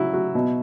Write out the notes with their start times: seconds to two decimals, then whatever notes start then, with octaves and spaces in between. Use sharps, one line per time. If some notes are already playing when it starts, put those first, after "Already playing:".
Already playing: C#3 F#3 E4
0.13 F#3
0.35 B2